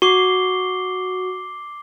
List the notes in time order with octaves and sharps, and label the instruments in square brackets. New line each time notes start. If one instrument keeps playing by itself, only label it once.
[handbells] F#4 [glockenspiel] D6 C7 G7